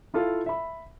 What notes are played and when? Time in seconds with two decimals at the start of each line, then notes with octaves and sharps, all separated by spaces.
0.14 E4 F4 A4 F5
0.46 E5 B5